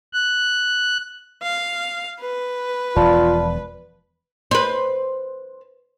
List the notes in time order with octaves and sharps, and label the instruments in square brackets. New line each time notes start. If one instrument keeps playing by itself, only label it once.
[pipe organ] F#6
[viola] F5
B4
[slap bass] E1 E2 F3 [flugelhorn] F4 [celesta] D5 A5 B5
[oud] B4 C5